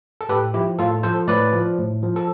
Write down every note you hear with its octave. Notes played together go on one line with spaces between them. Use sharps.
A4
A2 G4 B4
F3 E4 G4
A2 F4 A4
F3 A4 C5
A2 B4 D5
F3
A2
F3
A4